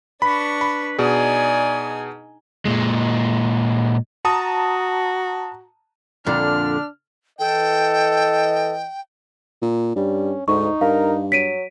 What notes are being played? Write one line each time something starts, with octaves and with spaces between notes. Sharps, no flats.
D4 B4 B5 C#6
B5
B2 D#4 G#4 D5 G#5
A#2 G#3
F#4 A5 A#5 D#6
F2 A#2 D3 D4 F6
E3 A4 D#5 G5
A#2
G2 G3 C#4
D2 G#2 D#4 C#6
G2 A#4 F5
F#3 B6 D7 D#7